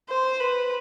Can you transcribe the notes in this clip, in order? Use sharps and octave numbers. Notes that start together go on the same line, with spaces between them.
C5
B4